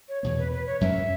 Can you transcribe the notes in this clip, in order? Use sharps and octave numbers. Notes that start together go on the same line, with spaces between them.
C#5
E2 B2 B3 C#5
B4
B4
C#5
F#2 F#3 C#4 E5